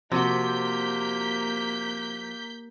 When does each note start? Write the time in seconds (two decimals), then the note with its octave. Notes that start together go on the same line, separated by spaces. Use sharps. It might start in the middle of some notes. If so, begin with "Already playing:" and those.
0.12 C3 F3 A#3 F#4 G6 B6